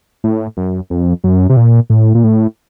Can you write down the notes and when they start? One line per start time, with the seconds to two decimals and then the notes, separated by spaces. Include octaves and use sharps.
0.24 A2
0.57 F#2
0.90 F2
1.24 F#2
1.50 C3
1.57 A#2
1.90 A2
2.15 A#2
2.24 A2